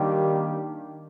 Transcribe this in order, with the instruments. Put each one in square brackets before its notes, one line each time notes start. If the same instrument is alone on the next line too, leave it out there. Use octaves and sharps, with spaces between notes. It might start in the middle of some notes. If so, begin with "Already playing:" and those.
Already playing: [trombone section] D#3 G3 A#3 D4 G4